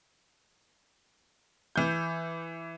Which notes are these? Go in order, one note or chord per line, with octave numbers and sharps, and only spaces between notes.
E3 G6